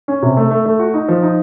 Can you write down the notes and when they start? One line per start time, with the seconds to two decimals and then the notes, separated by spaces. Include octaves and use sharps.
0.08 C#4
0.22 C3
0.37 A3
0.51 A3
0.66 A3
0.79 F#4
0.94 D#4
1.08 F3
1.23 D#4